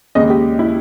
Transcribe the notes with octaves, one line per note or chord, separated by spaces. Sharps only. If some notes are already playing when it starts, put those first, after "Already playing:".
D#2 C#3 G#3 D#5
G4
E4